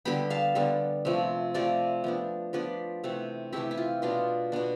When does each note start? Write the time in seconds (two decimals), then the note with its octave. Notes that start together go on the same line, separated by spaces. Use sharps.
0.05 D3 G3 B3 G5 B5
0.30 F5 A5
0.55 D3 G3 B3
1.05 C3 F3 A3
1.54 C3 F3 A3 D5 F5
2.04 F3 B3 D4
2.53 F3 B3 D4 B4 D5
3.04 C3 E3 A3 C4
3.52 C3 E3 A3 C4 E4 G4
3.71 E4
3.77 F4
4.02 B2 B3 D4 F4
4.52 B2 B3 D4